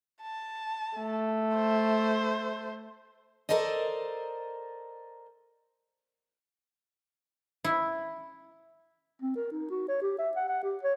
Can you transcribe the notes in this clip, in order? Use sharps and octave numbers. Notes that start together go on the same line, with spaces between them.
A5
A3
C5
A4 A#4 C5 D5 D#5
E4
C4
A#4
D#4
F#4
C#5
G4
E5
F#5
F#5
G4
C#5